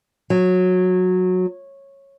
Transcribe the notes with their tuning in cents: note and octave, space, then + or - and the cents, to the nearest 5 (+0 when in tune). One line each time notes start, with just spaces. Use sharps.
F#3 -15